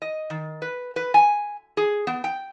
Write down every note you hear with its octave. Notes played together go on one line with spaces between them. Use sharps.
D#5
D#3
B4
B4
G#5
G#4
B3
G5